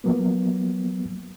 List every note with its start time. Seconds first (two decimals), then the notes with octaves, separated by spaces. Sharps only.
0.04 F3 F#3 A#3 B3